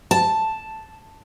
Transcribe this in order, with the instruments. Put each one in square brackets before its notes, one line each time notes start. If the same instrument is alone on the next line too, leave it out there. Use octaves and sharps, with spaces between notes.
[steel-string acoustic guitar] A5